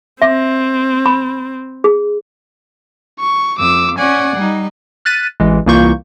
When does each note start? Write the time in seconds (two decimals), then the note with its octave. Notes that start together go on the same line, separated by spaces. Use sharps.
0.22 C4 E5
1.06 B5
1.84 G#4
3.20 C#6
3.59 F2 D6 E6
3.99 C#4 D5 F#5 G#5
4.36 G3 D#4
5.05 F6 F#6 A6 B6 D#7
5.40 A1 E3 G#3
5.66 C2 E3 A#3 F4 C#6 G6